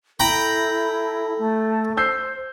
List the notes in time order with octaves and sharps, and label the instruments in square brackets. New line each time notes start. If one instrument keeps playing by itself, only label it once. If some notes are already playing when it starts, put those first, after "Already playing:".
[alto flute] E4 [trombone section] A4 [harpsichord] G5 A#5 B5
[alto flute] A3
[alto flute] C5 [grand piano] E6 G6 C7